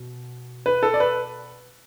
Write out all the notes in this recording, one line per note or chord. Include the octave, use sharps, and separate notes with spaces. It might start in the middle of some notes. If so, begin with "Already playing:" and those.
Already playing: B2
B4
A4
D5
B4